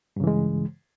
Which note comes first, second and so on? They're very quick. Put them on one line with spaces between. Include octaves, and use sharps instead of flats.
G2 C#3 E3 G#3